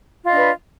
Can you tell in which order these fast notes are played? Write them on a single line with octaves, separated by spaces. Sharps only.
F4 D#5 D4 B4